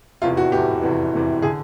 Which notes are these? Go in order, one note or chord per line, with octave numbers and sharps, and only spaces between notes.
F1 E2 C3 E3 F4
F#4
F1 E2 C3 E3 G4
F1 E2 C3 E3
F1 E2 C3 E3
D3 G#4